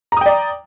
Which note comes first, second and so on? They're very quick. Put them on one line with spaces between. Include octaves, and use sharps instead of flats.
A#5 D#6 G5 D5